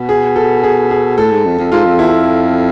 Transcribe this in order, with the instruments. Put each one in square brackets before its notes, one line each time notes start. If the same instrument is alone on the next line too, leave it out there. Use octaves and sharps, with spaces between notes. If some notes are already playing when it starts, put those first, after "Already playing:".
Already playing: [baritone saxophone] B2
[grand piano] G#4
A4
G#4
G#4
[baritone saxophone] A2 [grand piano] A4
[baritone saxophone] G#2
F2
F2
[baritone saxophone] G#2 [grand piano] F4
[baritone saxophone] F2
[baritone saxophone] E2 [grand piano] E4
[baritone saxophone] F2